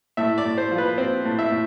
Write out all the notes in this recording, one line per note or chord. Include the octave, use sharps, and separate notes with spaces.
A2 E5
D5
A2
C5
F3
B4
C4 C5
A2
E5
A2